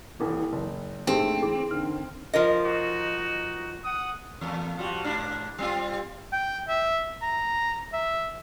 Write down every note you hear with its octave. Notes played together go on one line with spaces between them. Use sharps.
D#1 C2 E3
F#1
A#1 G#2 A3 C4 G4 G#4
E3 G#4 D6
D3 D#3 F6
F3 A#4 D#5
D#4 F#4
F#5 D#6
E2 A#2 A3
F3 G3 F#4
G#2 D4
G3 C4 F4
G5
E5
A#5
E5